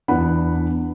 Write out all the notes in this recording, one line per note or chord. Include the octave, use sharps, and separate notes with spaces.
E2 E3 B3 D4 F#5 B5